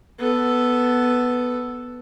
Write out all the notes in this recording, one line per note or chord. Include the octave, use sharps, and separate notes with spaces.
B3 A4